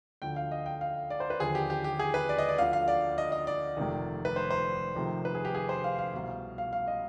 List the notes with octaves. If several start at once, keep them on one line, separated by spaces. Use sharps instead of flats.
D2 D3 F3 G5
F5
D#5
G5
F5
D5
C5
B4
D#2 D3 F3 G#4
G4
G4
G4
G#4
B4
D5
D#5
D5
D2 D3 F3 F5
F5
D5
D#5
D#5
D5
F1 F2 C3 D#3
B4
C5
C5
F1 F2 C3 D#3
B4
G#4
G4
G#4
C5
F5
F5
C2 B2
F5
F5
D#5